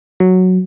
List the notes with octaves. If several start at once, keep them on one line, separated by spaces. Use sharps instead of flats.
F#3